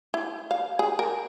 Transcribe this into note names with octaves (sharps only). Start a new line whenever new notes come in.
E4
F5
G#4
A#4